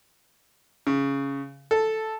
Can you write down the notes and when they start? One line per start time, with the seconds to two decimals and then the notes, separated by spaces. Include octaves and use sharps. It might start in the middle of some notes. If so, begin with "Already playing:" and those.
0.87 C#3
1.71 A4